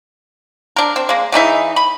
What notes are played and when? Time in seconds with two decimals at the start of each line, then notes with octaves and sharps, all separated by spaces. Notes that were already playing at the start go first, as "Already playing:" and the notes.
0.76 D4 A#4
0.96 C4
1.09 G#3 A#3
1.32 C#3 E3 D#4 E5
1.76 B5